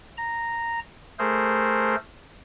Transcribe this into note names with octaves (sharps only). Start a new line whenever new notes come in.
A#5
A3 G#4 A#4 C5